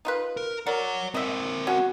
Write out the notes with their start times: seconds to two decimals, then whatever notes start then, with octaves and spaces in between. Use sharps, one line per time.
0.05 D#4 F4 B4
0.37 A#4
0.67 A#4 C#5 D5 F#5
1.14 C4 A#4 D#5 E5
1.67 C#4 F#4